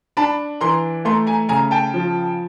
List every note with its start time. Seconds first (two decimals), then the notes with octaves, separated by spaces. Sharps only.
0.17 D4 A5 B5
0.61 E3 A#5 C6
1.05 A3 A#5 C6
1.27 G#5 A#5
1.49 C#3 G#5 A#5
1.71 G5 A5
1.94 F3